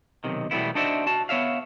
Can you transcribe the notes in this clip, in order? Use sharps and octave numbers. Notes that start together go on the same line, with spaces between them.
B1 C3 D#3
B2 E3 G3 A3 B3 E4
D4 D#4 F#4 C5 D5 E5
F#4 A5
B3 C#5 E5 F5